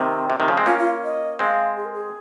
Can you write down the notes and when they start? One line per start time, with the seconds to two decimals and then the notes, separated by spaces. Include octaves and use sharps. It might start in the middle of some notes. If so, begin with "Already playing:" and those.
Already playing: C3 D#3 C4
0.30 C3
0.40 C3 D#3
0.48 C#3 F3
0.57 G#3 C4
0.66 A#3 C#4 F4
0.78 F4
1.04 D#5
1.39 G#3 C4 F5
1.77 G#4
1.85 A#4
1.93 G#4